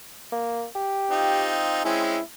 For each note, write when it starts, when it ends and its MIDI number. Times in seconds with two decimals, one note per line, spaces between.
0.32 0.64 58
0.75 1.56 67
1.10 1.81 60
1.10 1.81 63
1.10 1.81 65
1.85 2.17 56
1.85 2.17 60
1.85 2.17 61
1.85 2.22 64